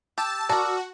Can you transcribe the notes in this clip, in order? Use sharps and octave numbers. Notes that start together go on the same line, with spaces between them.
G4 A5 E6
F#4 A#4 D5 A5